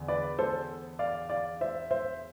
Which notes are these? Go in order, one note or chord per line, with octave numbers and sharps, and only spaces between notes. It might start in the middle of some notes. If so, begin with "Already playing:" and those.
Already playing: E2 D3
B4 D5
A4 C5
D5 F5
D5 F5
C5 E5
C5 E5